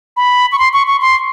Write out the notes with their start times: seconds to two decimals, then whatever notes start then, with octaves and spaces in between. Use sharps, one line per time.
0.17 B5
0.52 C#6
0.59 C6
0.73 C#6
0.87 C#6
1.01 C6